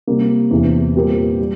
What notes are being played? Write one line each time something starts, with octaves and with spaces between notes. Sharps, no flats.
C3 G3 A#3
E2 C3 E3
A#2 G3 C4 G4 A#4
G3